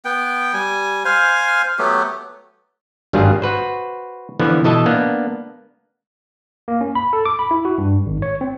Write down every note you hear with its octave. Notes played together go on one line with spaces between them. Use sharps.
B3 G5
G3 G#5
C5 F5 G#5
F#3 A3 B3 G4
G#1 G2 F#3 G3 F4 G#4
F#4 B4 C5
D3 E3 F3 B3 E4
B2 E3 A4 D#5 E5 A5
A#3 B3 D4
A#3
C#4
B5
A4
D6
B5
E4
F#4
G2
G#1
C#5
C4